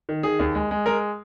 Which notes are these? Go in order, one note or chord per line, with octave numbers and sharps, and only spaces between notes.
D#3
D#3 G#4
D#2
G#3
G#3
G#3 A#4